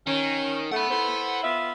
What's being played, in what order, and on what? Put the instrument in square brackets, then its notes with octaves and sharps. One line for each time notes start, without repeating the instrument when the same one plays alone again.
[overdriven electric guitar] D#3 [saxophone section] C#4
[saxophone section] A3 [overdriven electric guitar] F#5 B5
[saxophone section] E4 A4 C5
B3 F4 E5